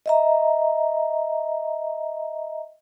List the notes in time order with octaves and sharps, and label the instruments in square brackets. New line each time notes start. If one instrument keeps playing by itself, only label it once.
[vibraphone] D#5 E5 A#5